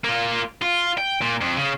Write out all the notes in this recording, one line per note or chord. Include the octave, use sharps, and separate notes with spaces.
A#3 F4
F4
G5
A#2
F2
C#3